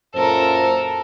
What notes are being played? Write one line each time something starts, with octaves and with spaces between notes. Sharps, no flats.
F#2 A#2 A4 A#4 C5